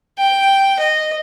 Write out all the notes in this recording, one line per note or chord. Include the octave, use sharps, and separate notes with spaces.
G5
D#5